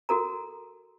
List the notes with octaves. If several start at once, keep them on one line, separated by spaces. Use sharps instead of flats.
F#4 A4 A#4 A#5